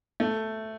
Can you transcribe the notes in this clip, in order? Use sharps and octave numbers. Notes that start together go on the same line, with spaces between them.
A3